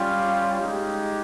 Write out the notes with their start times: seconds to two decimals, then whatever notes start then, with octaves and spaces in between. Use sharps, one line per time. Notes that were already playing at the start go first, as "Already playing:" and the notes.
Already playing: G3 C#4 F4 G4 F5
0.59 G#3 D#4 G4